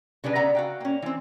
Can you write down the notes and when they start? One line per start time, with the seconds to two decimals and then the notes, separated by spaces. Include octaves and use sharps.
0.24 C#3 G3 D4 B4
0.35 C#3 B3 D5 E5 F#5 A#5
0.55 F#4 F5 G5
0.81 A#3 C#4
1.02 E3 C4